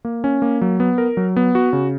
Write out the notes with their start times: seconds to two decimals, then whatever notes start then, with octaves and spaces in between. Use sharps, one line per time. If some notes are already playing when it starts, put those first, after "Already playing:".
0.05 A#3
0.24 C#4
0.42 A#3
0.61 F#3
0.80 B3
0.98 A#4
1.17 F#3
1.36 B3
1.55 F#4
1.73 C#3